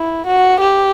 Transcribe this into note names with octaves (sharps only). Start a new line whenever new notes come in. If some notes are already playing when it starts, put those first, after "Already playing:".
Already playing: E4
F#4
G4